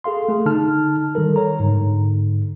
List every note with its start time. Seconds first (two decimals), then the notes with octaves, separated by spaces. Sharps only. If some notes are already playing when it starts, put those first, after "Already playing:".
0.04 G#4 A4 F5 C6
0.29 A3 G#4 A4
0.46 D3 D#4 A5 F6
1.15 D#3 G3 A4 A#4
1.36 C#5 A#5
1.60 G#2 D3